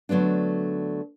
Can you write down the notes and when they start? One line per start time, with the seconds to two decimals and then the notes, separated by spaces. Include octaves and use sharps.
0.09 D3 F#3 A3 B3 D4